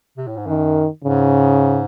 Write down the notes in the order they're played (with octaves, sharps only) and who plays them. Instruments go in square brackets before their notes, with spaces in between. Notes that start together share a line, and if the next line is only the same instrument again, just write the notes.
[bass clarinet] C3
A2
G#2
[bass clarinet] F#2 [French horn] D#3
[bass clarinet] G#2 [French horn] C#3